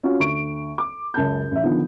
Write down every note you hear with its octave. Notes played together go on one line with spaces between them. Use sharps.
C#4 F4 F#4
D2 C#6 D7
D6
C#2 F#2 A5 G6
A1 E5
D3 D#3 F3 B3